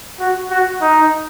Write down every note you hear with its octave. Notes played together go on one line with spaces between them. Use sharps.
F#4
F#4
D#4